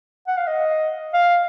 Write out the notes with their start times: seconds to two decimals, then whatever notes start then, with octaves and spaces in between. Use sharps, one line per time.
0.27 F#5
0.37 F5
0.47 D#5
1.14 F5